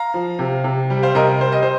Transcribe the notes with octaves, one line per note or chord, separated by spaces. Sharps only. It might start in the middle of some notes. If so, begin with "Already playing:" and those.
Already playing: F5 A#5
F3
C3
C3
G3
C5 F5
C3 A#4 D#5
G3 C5
D#5
C5